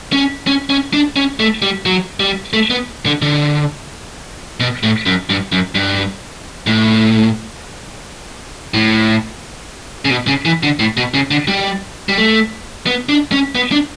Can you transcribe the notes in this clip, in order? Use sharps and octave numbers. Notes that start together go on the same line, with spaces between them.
C#4
C#4
C#4
D4
C#4
A3
G3
F#3
G3
A3
B3
D3
D3
B2
A2
F#2
G2
F#2
G2
A2
A2
C#3
B2
C#3
E3
D3
A2
B2
C#3
D3
G3
G3
A3
B3
D4
C#4
B3
D4